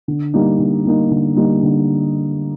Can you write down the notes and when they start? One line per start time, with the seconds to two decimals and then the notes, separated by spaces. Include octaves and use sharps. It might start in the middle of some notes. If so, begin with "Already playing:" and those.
0.08 D3
0.34 G3 A#3 D#4
0.59 D3
0.85 G3 A#3 D#4
1.11 D3
1.36 G3 A#3 D#4
1.63 D3